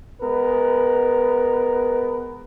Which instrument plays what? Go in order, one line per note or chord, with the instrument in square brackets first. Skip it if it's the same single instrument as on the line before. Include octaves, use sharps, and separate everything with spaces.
[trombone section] G#3 B3 A#4 B4